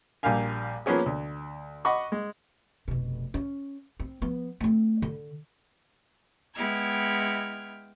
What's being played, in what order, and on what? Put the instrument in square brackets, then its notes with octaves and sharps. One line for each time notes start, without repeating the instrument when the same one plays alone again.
[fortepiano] A#1 G3 A#3 F5 G#5
F3 A#3 B3 C#4 G#4
D2
D#5 F#5 B5 C#6 D6
G#3
[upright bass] F1 B2
C#4
C4
F3 B3
A3 C4
D3
[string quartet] G#3 B3 E4 G5 F6 G#6